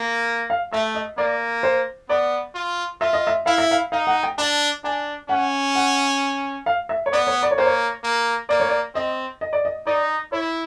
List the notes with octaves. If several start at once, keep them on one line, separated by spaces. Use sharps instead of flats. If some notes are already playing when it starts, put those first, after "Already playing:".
Already playing: A#3
F5
A3 E5
D#5
A#3 D5
C5
B3 D5
F4
F4 E5
D#5
E5
E4 F5
E5
F5
D#4 F5
F#5
G5
D4 A5
D4 G#5
C#4 F#5
F#5
F5
E5
C#5
B3 D5
C#5
D5
C#5
A#3 C5
C#5
A#3
A#3 D5
C#5
D5
C4 D#5
D#5
D5
D#5
D#4 D5
E4 C#5